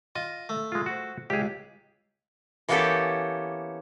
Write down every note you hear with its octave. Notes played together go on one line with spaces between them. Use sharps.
F4 D#5
A3
G#3 F4
F#4 C5
C#2 G4 G#4
E3 A#3 B3 C#4 G4 A4